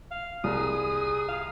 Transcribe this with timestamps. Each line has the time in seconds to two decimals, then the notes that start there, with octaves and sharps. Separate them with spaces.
0.11 F5
0.44 C2 G#4 D#6
1.28 F5